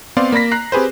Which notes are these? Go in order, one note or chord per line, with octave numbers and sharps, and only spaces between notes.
B3 C4 D5 F5 C6
A#3 D5 B5 A#6 B6
A#5 F#6 C7
C4 G4 G#4 B4 C5